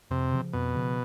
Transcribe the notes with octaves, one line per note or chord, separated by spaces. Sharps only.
F2 C3
C#3 F3
F2 B2
C#3 F3